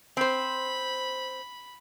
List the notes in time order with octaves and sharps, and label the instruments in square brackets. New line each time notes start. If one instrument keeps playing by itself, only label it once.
[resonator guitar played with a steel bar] C4 C5 [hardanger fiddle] B5